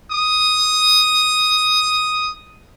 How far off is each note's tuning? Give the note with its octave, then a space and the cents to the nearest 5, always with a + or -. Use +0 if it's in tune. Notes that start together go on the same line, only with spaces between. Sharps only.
D#6 +5